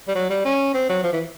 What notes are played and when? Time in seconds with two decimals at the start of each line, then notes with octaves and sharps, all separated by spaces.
0.08 G3
0.15 F#3
0.30 G3
0.45 C#4
0.74 C4
0.89 F#3
1.04 F3
1.13 E3